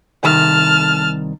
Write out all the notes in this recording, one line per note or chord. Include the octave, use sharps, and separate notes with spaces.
C2 D#3 A5 F6